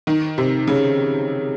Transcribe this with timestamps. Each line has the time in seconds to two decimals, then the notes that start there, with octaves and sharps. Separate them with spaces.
0.07 D#3
0.38 C3
0.67 C#3